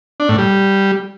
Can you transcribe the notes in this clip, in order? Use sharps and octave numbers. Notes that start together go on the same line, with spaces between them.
D4
A2
G3